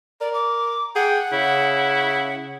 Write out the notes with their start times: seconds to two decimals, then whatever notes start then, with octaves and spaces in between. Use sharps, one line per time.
0.21 A#4 D5
0.34 D6
0.96 G#4 F#5 G5
1.32 C#3 E4